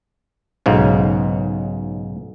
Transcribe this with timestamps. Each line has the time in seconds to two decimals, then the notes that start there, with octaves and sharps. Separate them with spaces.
0.66 B1 G#2 C#3